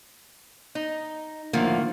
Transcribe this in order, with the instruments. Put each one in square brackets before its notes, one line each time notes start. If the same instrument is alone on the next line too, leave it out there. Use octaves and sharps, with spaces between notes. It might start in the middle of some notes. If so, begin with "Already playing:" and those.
[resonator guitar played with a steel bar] D#4
[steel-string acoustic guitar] A2 D3 F3 [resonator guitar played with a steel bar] D#3 A#3